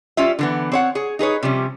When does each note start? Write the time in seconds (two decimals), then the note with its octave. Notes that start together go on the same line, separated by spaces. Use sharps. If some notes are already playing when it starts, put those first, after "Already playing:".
0.17 G3 C#4 F4 E5
0.39 D3 E3 B3
0.72 C4 C#5 F#5
0.95 G#4 C#5
1.19 D#4 G#4 B4 C#5
1.43 C3 F3 G3 C#4